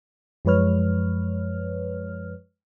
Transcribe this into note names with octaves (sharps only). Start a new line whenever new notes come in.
F#2 F3 G#3 B4 C#5 F6